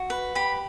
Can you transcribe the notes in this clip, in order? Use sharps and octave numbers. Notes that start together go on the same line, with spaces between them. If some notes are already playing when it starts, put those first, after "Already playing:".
Already playing: F#4
B4
G4 B5